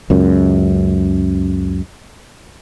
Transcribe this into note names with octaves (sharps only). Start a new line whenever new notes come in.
C#2 F#2